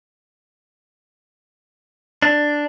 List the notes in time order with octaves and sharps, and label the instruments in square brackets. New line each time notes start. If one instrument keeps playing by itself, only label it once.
[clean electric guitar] D4